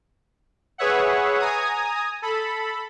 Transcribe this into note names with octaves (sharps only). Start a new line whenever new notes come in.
G#4 B4 C#5 E5 F#5
G#5 A#5 D#6
A4 B5